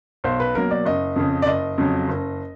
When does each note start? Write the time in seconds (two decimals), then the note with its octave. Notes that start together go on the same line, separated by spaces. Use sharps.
0.24 B1 C5
0.40 B4
0.55 B2 F#3 A#3 A#4
0.71 D5
0.85 F#1 D#5
1.16 F2 C#3
1.42 D5
1.47 F#1 D#5
1.78 F2 C#3 F#3
2.09 F#1